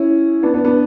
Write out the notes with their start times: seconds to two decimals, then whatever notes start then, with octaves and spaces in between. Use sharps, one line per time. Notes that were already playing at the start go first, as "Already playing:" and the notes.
Already playing: C#4 E4
0.43 B3 D4
0.54 B3 D4
0.65 B3 D4